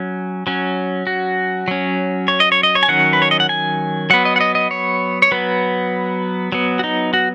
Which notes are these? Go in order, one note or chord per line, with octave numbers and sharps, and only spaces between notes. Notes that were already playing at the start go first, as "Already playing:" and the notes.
Already playing: F#3 C#4
F#3 C#4
F#4
F#3 C#4
C#5
D#5
C#5
D#5
C#5
G#5
D#3 F#3 C#4 F#5
B4
C#5
D#5
F#5
G#5
F#3 B3 F#5
D#5
F#5
D#5
D#5
C#5
C#5
F#3 B3 B4
F#3 B3
F#4
D#4
F#4